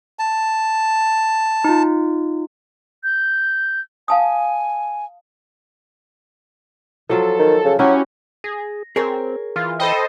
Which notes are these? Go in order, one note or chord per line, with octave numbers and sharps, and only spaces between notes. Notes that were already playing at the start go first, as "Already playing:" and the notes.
A5
D#4 F4
G6
F5 G#5 A5 D#6
F3 F#3 F4 A4
D#3
C#3
F#3 C#4 E4 F#4 G4
G#4 A#6
C4 G#4 A#4 C#5
E3 F4 F6
A4 C5 D#5 G5 B5